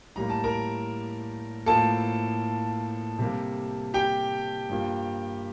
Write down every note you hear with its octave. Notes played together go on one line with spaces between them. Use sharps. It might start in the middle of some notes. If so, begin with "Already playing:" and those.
A2 G3 A#3 A#5
A5
A#4 A#5
A2 F3 A#3 A4 A5
C3 G3 A#3
G4 G5
G2 F3 A#3